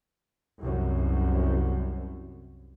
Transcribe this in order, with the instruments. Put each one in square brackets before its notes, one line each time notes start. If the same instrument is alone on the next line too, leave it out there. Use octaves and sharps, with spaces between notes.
[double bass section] C2 F#2